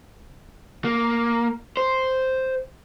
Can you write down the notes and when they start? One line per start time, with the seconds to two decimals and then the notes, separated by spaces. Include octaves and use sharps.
0.85 A#3
1.77 C5